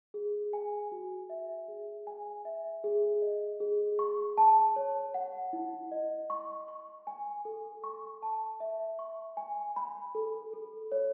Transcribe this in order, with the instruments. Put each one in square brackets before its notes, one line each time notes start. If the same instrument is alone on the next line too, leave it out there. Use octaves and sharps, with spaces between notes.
[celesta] G#4
G#5
F#4
E5
G#4
G#5
E5
G#4
D#5
G#4
C#6
A5
C#5
F#5
E4
D#5
C#6
C#6
G#5
A4
C#6
A5
E5
C#6
G#5
B5
A4
A4
C#5